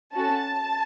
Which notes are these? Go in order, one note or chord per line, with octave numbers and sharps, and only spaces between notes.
C#4 F#4 A4 A5